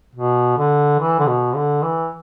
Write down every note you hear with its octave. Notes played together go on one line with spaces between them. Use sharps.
B2
D3
E3
D3
B2
D3
E3